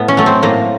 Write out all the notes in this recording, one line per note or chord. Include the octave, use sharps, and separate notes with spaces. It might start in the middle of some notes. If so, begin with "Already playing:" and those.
Already playing: A2 B3
C#4
F#3 A3
C4
A2 A#3